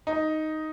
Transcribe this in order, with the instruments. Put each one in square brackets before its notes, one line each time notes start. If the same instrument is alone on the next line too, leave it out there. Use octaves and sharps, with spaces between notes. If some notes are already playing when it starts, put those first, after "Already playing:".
[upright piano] D#4